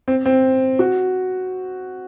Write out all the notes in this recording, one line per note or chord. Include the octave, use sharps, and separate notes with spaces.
C4
C4
F#4